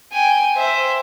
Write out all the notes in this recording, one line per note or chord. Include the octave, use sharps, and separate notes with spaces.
G5 G#5
C5 E5